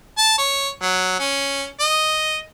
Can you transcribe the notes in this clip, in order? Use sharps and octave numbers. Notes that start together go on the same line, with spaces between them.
A5
C#5
F#3
C#4
D#5